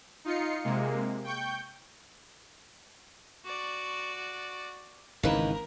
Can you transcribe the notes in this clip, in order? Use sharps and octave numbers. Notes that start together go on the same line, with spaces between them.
D#4 F4 C7 C#7
C3 G#3 A#3
G5 C#6 G6
F#4 D5
G#1 D#2 C#3 E3 A#4 B4